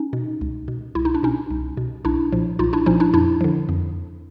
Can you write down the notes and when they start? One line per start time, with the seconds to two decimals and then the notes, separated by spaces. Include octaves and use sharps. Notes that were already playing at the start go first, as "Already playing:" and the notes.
Already playing: C#4 D#4
0.13 B2
0.41 C#2
0.68 B2
0.95 C2 E4
1.05 D#4
1.14 D4
1.23 B2 C#4 D#4
1.50 C2
1.77 B2
2.05 B1 D4 E4
2.32 A#2 F3
2.59 B1 D#4 F4
2.73 D4 E4
2.86 A#2 F3 C#4 D#4
3.00 D4 E4
3.14 F2 D4 E4
3.41 D3 F3
3.69 F2